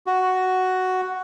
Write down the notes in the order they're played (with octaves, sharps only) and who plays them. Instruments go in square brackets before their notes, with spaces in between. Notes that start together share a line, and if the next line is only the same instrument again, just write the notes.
[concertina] F#4